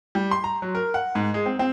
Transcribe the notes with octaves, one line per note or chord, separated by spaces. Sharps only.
G3
C6
A#5
F#3
A#4
F#5
G#2
G#3
C4
C4